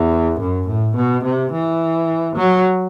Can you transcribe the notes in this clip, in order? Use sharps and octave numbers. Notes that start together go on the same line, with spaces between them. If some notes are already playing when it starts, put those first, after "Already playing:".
Already playing: E2
F#2
A2
B2
C3
E3
F#3